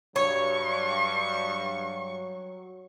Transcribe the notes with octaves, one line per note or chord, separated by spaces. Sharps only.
G2 F#3 C#5 C#6